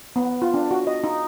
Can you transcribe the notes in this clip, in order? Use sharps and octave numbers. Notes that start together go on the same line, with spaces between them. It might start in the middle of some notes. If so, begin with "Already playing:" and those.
B3
F4
D4
F#4
D#5
D#4